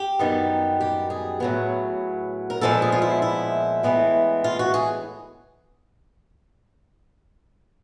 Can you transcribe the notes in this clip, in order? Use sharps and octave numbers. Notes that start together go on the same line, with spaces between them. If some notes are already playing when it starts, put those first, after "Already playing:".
Already playing: G4
F#2 D#3 G3 B3
G4
G#4
A2 F#3 B3
A#4
A#2 F3 G#3 B3 A4
G#4
F4
E4
E4
A2 E3 G#3 B3
F4
F#4
G#4